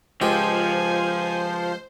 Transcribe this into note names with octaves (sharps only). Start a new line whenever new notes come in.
C#2 F3 G4 C5 D#5 G#5 G6 C7